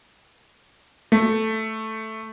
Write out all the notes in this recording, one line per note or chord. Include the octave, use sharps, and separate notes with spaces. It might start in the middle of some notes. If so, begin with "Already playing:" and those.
A3